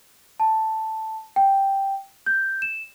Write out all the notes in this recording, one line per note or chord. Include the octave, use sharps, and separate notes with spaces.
A5
G5
G6
E7